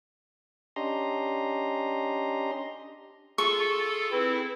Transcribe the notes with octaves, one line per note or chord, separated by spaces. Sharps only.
C#4 D4 G4 D#5 A#5 C6
F4 G#4 A4 C#6
C4 E4 B4